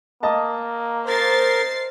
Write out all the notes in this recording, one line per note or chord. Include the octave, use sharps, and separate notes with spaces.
A#3 D#5 A5
A#4 C5 A6 C7